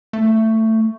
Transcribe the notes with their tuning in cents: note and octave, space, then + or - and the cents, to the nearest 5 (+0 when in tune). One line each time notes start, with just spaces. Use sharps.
A3 +15